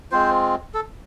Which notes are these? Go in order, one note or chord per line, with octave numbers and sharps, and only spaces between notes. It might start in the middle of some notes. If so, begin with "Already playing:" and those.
G#3 C4 F4 C5
A4